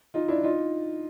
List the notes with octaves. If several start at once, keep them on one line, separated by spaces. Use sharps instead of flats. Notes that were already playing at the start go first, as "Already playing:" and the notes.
D#4 F4
D4 E4
D#4 F4